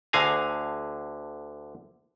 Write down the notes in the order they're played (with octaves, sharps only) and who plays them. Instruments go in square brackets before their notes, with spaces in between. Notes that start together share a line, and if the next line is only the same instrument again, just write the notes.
[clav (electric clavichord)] D2 D3 G#4 F5 G#5 A#5